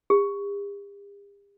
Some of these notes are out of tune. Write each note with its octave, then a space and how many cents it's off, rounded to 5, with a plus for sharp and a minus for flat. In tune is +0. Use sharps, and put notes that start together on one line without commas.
G4 +45